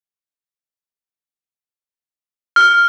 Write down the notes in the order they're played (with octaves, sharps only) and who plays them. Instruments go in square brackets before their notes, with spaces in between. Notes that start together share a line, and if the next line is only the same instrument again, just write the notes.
[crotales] F6